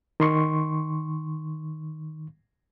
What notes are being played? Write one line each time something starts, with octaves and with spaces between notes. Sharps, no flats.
D#3 C6 C#6